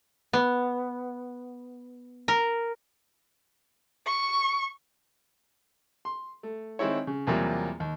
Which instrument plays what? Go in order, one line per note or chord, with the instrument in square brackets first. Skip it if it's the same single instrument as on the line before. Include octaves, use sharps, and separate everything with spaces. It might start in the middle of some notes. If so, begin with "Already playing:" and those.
[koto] B3
A#4
[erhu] C#6
[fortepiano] C6
A3
D#3 G#3 C4 E4 C#5
C#3
E2 C3 F#3 G3 A#3 F4
D#2